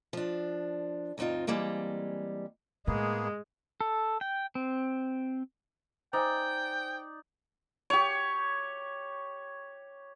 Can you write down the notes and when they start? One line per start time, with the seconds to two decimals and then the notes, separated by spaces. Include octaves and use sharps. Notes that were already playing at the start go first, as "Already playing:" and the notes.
0.13 F3 D4
1.18 D2 G2 C4 D#4 F4
1.47 E3 G3 G#3 A#3 C4
2.87 A2 G#3 A#3 B3 G#4
3.81 A4
4.21 G5
4.55 C4
6.13 D#4 C5 D5 G5 G#5
7.90 G4 C#5